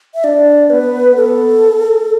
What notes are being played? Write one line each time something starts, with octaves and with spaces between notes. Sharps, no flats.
E5
D4 D5
B3 B4
B3 A4